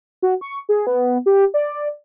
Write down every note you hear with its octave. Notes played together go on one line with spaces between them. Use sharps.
F#4
C#6
G#4
B3
G4
D5